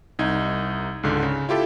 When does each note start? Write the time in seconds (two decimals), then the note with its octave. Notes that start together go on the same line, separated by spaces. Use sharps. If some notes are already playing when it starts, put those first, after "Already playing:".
0.19 C2 D#4 G#6
1.03 C#2 G#2 D3
1.23 C#3
1.49 E4 F4 G4 A4